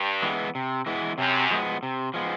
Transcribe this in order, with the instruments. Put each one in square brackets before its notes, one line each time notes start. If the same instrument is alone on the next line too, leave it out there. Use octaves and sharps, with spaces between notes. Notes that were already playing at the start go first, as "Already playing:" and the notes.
Already playing: [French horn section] G2
[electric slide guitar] E3 G#3 B3 E4
C3
E3 G#3 B3 E4
[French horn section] F#2 [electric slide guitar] C3
[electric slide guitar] F3 G#3 B3
C3
F3 G#3 B3